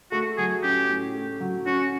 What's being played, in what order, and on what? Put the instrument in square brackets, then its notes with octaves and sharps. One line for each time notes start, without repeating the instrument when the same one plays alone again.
[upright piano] A3 [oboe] F#4
[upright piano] F#3 [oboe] G#4
[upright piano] C#4 [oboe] G4
[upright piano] A2
A3
F#3
[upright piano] C#4 [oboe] F#4